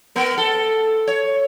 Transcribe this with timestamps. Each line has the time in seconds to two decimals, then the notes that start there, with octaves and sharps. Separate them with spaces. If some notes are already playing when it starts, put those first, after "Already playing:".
0.16 B3 A#4
0.38 A4
1.08 C#5